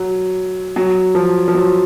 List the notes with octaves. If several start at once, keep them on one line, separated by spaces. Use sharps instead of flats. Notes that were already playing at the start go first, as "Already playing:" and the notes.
Already playing: F#3
F#3
F3
F3
F#3